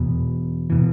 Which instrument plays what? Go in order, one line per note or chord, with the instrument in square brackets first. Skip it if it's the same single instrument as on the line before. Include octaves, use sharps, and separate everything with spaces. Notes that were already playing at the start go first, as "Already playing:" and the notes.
Already playing: [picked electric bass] E2 B2
B2 E3